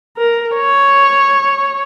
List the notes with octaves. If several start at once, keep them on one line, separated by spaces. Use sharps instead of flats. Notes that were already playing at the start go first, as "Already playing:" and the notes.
A#4
C#5